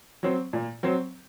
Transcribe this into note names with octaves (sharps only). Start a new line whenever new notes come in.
F#3 C4
A#2
F#3 C4